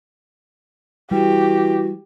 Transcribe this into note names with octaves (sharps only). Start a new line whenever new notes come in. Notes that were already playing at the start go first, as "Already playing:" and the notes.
E3 G3 F#4 G4